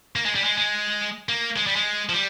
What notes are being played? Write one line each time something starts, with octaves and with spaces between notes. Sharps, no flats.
A#3
G#3
G3
G#3
G#3
A#3
G#3
G3
G#3
F3
G3